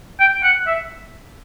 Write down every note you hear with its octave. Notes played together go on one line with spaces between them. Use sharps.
G5
F#5
E5